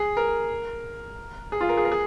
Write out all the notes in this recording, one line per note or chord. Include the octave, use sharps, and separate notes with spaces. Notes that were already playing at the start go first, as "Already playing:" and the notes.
Already playing: G#4
A#4
G#4
F4
A#4
G#4
A#4
G#4